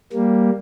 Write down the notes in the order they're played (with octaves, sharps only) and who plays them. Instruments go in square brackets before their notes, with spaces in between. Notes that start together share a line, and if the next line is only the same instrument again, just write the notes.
[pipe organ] G3 A#3